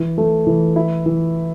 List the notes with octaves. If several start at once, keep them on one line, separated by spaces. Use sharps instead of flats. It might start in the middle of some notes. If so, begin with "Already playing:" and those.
Already playing: E3
A3
E3
E4
E3